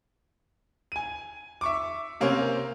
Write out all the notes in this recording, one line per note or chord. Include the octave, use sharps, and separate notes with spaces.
G#5 D#7
E5 C#6 D6
C3 A#3 C#4 A#4 C5